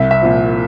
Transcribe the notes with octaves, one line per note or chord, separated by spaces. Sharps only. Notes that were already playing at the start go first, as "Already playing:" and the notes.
Already playing: C2 E5
E5
A#2 F3